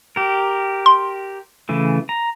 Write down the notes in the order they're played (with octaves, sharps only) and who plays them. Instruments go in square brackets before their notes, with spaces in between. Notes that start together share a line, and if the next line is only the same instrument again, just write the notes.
[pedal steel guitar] G4 A#4
[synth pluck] C6
[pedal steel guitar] C#3 E3 A3
A#5